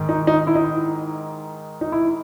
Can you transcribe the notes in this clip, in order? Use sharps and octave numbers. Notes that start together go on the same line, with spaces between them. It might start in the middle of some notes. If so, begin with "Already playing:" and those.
Already playing: G#2 D#3
D#4
D#4
E4
D#4
D#4
E4